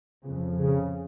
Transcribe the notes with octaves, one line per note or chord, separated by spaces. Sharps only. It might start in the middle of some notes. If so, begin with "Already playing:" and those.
F2 C#3
C#3